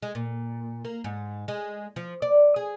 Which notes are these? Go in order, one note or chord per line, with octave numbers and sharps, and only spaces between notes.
G#3
A#2
A#3
G#2
G#3
F3
D5
G#4